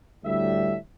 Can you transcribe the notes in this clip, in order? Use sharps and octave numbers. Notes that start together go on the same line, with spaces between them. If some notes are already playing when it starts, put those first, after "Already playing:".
D2 A2 G3 E5